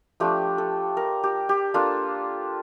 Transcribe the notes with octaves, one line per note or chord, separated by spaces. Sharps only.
F3 A3 D4 G4
A4
A#4
G4
G4
A#3 D4 F4 A4